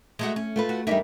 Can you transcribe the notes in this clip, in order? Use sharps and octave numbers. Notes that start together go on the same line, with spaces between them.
G#3 A3 F#4
C#4
A3 F4 B4
F#4
E2 G3 D4 D#4 A#4 E5